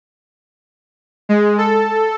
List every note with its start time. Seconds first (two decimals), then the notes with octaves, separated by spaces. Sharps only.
1.29 G#3
1.58 A4